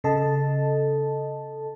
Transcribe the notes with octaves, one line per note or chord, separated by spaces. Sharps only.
C#3 A4 D#5 A5